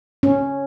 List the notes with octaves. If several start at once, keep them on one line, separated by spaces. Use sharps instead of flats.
C#4